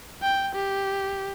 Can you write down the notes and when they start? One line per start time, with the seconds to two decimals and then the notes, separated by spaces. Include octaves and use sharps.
0.22 G5
0.55 G4